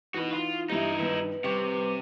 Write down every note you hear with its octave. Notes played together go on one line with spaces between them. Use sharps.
E3 D#4 F#4 B4
F4
G2 E3 D#4 E4 G4 E5
G2 D#3 B4
C3 G3 B4 C#6 D6